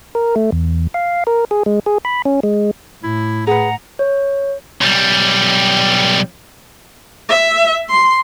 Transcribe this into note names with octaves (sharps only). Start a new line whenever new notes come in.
A#4
A3
E2
F5
A#4
G#4
G#3
G#4
B5
C#4
G#3
A2 E4
G#4 B4 F#5 A#5
C#5
B1 G3
E5
C6